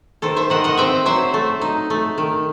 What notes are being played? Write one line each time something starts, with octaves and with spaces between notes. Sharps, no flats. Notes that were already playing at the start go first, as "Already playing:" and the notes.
D#3 A4 C5
C5 E5
D#3 D#5 F#5
D#5 F#5
C4 E5 G5
F#3 C5 E5
A3
D#4
A3
D#3